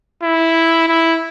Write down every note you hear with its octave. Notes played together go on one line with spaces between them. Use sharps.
E4
E4